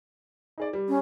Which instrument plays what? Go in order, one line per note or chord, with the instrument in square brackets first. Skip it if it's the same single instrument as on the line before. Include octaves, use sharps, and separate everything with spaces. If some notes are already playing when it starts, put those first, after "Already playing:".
[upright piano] D#4 G#4 D5
G3
[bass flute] C#4